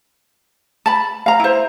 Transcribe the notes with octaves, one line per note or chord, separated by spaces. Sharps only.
A5 B5
F5 A#5
E4 C5